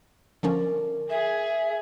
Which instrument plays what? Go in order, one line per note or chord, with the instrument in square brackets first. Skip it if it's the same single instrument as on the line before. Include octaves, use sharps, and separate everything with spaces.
[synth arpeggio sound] D3 F3 C#4 [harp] A#4 D5
[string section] G#4 [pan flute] E5 [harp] E7